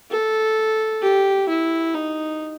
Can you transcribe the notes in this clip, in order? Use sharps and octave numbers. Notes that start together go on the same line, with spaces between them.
A4
G4
E4
D#4